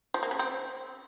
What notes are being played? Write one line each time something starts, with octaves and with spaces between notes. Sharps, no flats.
F3
A#3
C#3
C4